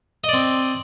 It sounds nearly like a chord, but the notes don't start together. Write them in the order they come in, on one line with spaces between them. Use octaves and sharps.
D#5 D5 C4